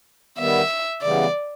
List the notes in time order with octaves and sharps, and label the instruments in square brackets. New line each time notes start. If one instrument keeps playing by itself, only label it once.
[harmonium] D#3 G3 B3 [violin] E5
[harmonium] C#3 E3 G3 B3 [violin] D5